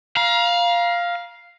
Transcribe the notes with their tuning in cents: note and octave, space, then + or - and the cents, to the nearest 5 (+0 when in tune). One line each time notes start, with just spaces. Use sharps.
F5 +0 A#5 +35